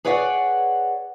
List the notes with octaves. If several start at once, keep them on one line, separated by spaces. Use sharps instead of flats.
G#4 B4 C#5 D5 E5 F#5